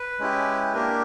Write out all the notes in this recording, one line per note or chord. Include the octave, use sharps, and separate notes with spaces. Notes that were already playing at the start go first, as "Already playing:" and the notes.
Already playing: B4
G#3 C#4 E4 G4
A#3 D4 G4 A#4